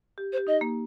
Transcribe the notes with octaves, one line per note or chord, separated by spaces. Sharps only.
G4
C5
G4
D#4 D#5
A#3